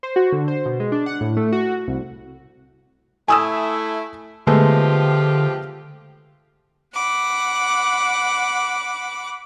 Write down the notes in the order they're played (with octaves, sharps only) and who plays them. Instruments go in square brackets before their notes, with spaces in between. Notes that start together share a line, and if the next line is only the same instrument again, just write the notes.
[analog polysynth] C5
F#4
D3
C5
B2
G#3
D4
F#5
A2
A3
F#4
C2
[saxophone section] A3 E4 [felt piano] G#5 D#6 E6
[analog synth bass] D3 [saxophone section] F3 F4 G4 [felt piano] G#3 A3 B3
[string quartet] F#5 B5 D6